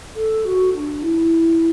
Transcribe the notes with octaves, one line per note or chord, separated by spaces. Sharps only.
A4
F#4
D4
E4